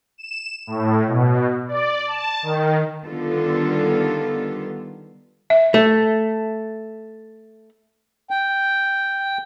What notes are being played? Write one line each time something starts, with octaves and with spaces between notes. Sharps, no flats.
E7
A2
B2
D5
A5
D#3
D3 D#3 G3 B3 F4 A4
E5
A3
G5